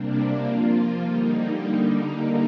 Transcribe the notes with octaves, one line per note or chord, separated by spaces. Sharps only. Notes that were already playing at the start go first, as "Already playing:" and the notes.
Already playing: C3 G3 A#3 D4
F3 A#3 F4
D3 G3 A#3 D#4